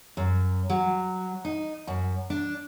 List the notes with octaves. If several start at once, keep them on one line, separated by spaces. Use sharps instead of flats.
F#2
F#3
D#4
F#2
D4